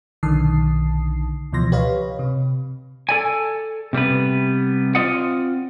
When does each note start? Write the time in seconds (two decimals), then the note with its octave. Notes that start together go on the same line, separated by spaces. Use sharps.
0.23 B1 D3 D#3 A5 D#6 C7
1.52 C#2 B2 E3 F3 C6 A#6
1.72 G4 B4 C#5 D#5 F5 B5
2.19 C3
3.09 A4 D5 G#5
3.93 C3 G3 B3 B4
4.95 C4 F4 D5 D#5 F#5